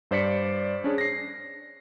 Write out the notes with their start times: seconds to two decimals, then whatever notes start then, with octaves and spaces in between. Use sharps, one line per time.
0.11 G2 C5 D5 B6 C#7
0.84 C#4 D4 G#4 C#5
0.98 A#6 C7